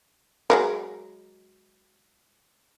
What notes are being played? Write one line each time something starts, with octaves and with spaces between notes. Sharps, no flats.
F#3 G#3 A#4